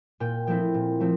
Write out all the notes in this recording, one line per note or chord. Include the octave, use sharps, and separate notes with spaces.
A#2 G5
F3 A3 C4 E4 G5
A#2
F3 A3 C4